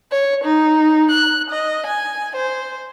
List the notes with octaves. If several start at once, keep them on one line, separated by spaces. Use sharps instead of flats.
C#5
D#4
F#6
D#5
G#5
C5